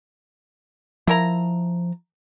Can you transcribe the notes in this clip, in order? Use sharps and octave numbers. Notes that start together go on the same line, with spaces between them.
F3 E4 A#4 A#5